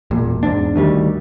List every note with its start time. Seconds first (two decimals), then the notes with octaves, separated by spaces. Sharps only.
0.11 E1 A#2
0.43 E2 G#2 D4
0.76 D2 D#3 G3